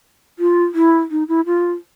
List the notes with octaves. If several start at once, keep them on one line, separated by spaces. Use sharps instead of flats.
F4
E4
D#4
E4
F4